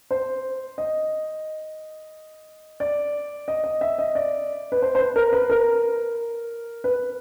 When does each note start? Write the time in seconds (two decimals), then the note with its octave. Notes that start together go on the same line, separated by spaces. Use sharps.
0.11 C5
0.78 D#5
2.80 D5
3.48 D#5
3.64 D#5
3.81 E5
3.98 D#5
4.15 D5
4.72 B4
4.82 C5
4.95 C5
4.99 B4
5.16 A#4
5.33 B4
5.50 A#4
6.84 B4